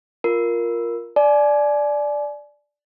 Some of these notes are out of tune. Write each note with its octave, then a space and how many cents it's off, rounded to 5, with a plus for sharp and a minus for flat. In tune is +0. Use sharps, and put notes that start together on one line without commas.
F4 +0 A#4 +5
D5 +0 G#5 +35